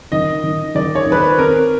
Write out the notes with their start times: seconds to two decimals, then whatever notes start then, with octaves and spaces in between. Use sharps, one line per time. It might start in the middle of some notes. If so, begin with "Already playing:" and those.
0.12 D#3 D#5
0.44 D#3
0.75 D#3 D5
0.95 C#5
1.06 D#3
1.12 B4
1.18 C5
1.38 C4 A#4